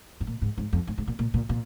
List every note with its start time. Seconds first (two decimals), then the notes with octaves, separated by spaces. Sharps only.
0.21 G#2
0.27 A#2
0.42 G#2
0.58 G#2
0.73 F2
0.87 G#2
0.98 G#2
1.07 A#2
1.19 A#2
1.34 A#2
1.49 A#2